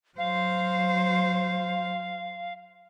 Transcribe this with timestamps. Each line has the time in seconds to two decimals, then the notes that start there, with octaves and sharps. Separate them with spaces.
0.18 F#3 C5 F5